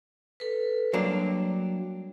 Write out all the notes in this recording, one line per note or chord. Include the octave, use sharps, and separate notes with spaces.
A4 B4
F#3 G3 A#3 D4